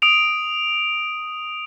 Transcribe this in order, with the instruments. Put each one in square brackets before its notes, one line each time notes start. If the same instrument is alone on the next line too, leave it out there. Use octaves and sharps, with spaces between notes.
[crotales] D#6 D7 F7